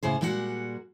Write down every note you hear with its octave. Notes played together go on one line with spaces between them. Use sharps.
A2 C#3 G#4 C5
A#2 G3 G#3 F#4 G4 F#5